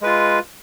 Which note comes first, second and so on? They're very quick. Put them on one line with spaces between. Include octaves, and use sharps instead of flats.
G#3 B4 F4